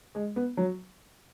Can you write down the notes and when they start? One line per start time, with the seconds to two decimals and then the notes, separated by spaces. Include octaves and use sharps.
0.15 G#3
0.36 B3
0.57 F#3